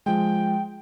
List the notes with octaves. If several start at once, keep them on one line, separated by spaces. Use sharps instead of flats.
F3 G#3 G5